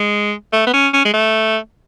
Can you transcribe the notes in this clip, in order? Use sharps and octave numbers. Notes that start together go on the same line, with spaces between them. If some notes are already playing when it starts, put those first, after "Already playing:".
Already playing: G#3
A3
B3
C#4
C#4
G#3
A3